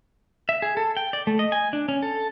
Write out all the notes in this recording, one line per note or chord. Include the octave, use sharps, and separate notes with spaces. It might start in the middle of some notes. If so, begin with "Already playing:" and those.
E5
G#4
A4
G5
D5
A3
D#5
G#5
D4
C#4
A4